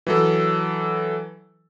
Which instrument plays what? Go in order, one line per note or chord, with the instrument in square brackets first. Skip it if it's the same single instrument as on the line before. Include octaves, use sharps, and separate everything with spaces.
[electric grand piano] E3 F#3 A4